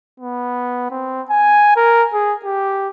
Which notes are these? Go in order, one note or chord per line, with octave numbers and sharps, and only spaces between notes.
B3
C4
G#5
A#4
G#4
G4